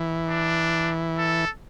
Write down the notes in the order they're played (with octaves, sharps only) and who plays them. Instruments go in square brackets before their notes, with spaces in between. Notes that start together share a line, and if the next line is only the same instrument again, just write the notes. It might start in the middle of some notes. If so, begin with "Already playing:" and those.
Already playing: [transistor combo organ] E3
[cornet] D4
A4